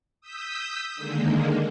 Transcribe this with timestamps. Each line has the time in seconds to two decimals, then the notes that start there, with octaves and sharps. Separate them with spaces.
0.21 D#6 E6 G6 B6
0.96 D3 D#3 G#3 A#3